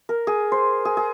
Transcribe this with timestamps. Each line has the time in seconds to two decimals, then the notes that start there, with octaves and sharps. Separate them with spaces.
0.09 A#4
0.27 G#4
0.52 C5
0.85 G#4
0.97 G#4